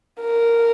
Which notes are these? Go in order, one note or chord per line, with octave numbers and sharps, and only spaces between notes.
A#4